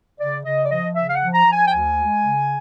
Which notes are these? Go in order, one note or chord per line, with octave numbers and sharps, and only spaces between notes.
C#3 D5
C#3 D#5
D5
F3 D#5
C#3 E5
F5
F#5
F3
A#5
F3
G#5
G5
D2 G#5
G#3
C#3